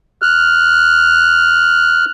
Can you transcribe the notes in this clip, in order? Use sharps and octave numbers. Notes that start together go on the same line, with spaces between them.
F6 F#6